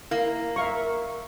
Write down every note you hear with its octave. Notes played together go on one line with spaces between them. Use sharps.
A#3 E4
A#4 E5 F5 C#6